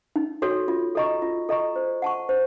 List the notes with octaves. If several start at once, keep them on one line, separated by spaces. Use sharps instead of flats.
D#4
F#4 A4 C#5
F4
A4 D#5 A#5 C#6
F4
A4 D#5 A#5 C#6
C5
F#5 A5 C#6
C5